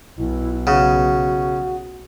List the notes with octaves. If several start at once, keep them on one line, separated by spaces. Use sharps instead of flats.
B1 E4
C#3 F#4 F#5